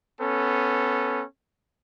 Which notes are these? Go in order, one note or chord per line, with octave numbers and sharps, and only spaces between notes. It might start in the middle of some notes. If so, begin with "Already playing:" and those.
B3 C#4 A4